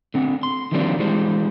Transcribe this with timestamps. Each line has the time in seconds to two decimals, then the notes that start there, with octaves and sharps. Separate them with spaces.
0.14 D3 C4 F#5
0.43 C6
0.72 D#3 F3 G3 A#3 C4 D4
0.99 E3 G3 G#3 C5